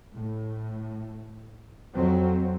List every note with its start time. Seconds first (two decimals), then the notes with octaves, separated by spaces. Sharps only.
0.13 A2
1.94 F2 F#3 C4